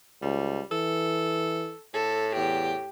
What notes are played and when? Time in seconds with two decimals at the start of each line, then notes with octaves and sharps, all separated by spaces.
0.22 C#2 G3
0.71 E3 A4
1.94 A2 A4
2.35 E2 G4